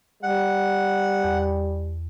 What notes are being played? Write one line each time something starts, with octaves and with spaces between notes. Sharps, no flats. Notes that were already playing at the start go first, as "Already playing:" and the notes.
G3 F#5
E2